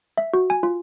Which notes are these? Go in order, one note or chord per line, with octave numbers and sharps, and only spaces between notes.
E5
F#4
G#5
F4